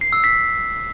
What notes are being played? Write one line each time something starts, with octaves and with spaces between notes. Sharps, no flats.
C7
E6
B6